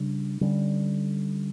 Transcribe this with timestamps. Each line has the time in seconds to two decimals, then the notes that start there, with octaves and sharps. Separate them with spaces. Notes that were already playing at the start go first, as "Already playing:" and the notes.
Already playing: C#3 G3 D4
0.41 D3 G3 C#4